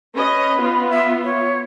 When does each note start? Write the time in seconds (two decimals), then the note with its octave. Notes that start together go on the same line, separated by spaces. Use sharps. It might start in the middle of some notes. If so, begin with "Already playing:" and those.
0.15 C#4 B4 D#5
0.59 B3 F4
0.90 E5
1.24 C#5